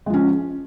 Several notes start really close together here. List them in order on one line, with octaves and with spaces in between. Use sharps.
G#3 F3 C#4